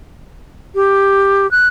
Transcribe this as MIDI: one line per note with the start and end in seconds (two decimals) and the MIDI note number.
0.75 1.50 67
1.51 1.68 90